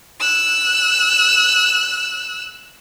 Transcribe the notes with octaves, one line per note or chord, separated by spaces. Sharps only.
E6 F#6